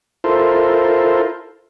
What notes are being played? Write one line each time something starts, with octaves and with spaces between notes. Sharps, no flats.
E4 F4 A4 A#4 C5